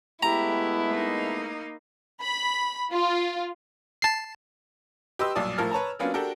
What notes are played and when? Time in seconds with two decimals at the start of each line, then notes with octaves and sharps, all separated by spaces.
0.23 G#3 A3 B3 E4 G4 A#5
0.89 A#3 D#4
2.21 B5
2.91 F4
4.02 A5 C7
5.19 G4 B4 D#5 C6 E6
5.35 B1 G2 A#2 D5 A5 D#6
5.58 A2 F3 A#4 A5 F6
5.71 B4 C#5 A5 A#5
5.99 F#3 A#3 B3 C#4 D4 F4
6.14 D4 F#4 G4 A4 A#4